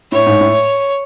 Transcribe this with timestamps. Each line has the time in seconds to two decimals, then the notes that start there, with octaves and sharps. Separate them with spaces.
0.12 A2 C#5
0.27 G#2
0.41 A2